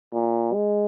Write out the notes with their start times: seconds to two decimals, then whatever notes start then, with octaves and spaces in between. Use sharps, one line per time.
0.13 A#2
0.53 G#3